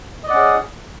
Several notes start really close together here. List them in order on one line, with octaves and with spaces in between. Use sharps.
D#5 D5 F#5 C#4 G#4